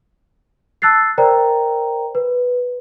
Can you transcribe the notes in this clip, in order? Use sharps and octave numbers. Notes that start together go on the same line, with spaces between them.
A5 E6 F#6 A6 C7
A#4 C5 D5 G5 A#5
B4